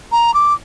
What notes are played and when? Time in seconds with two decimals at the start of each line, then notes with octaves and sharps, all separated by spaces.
0.12 A#5
0.34 D6